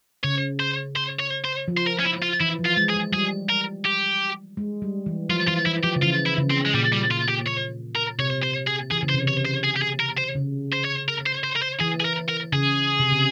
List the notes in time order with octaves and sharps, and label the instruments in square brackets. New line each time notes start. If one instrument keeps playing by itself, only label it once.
[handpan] C#3 [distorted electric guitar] C#5
[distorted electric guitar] C5
C5
C#5
C5
[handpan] F3
[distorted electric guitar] C5
A#4
C#4
E4
F4
[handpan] E3 [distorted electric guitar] E4
[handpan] F3
[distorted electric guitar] F4
[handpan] G#3
[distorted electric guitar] G#4
[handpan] G#3
[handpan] G3 [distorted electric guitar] G#4
[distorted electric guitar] A#4
G4
[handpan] G#3
G3
E3
[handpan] F3 [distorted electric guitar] F4
[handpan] E3 [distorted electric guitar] F4
[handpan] E3 [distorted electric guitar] E4
[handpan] F3 [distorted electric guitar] G4
[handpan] C#3
[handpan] E3 [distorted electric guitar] F4
[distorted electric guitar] E4
[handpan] C#3
[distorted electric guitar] C4
G#3
[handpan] A#2 [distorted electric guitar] G3
[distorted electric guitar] G3
F4
G4
C#5
A#4
[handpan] C3 [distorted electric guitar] C#5
[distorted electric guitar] C5
G#4
[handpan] E3 [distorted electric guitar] G#4
[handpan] C#3
[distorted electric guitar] C5
[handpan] C3
[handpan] C#3 [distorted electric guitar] C#5
[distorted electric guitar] C5
G#4
G4
G#4
A#4
C5
[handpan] C#3
[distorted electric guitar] C5
C#5
A#4
C5
C5
A#4
C5
[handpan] E3 [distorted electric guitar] G#4
[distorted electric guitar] G#4
A#4
A#4
[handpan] C#3 [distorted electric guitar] G#4
[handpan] C3
C#3